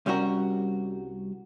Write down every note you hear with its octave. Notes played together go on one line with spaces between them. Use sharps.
C2 G3 C#4 F#4 A#4